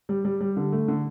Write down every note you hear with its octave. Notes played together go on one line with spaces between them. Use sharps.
G3
G3
G3
D3
A3
D3